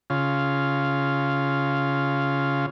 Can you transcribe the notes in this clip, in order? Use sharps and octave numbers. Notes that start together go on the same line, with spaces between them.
C#3 F4